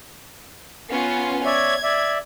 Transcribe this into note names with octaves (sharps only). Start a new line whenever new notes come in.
B3 C#4 F4
C#5 D5 E5 G#6
D5 E5